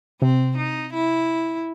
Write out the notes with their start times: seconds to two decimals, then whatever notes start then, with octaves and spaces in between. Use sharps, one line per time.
0.21 C3 C4
0.57 D#4
0.94 E4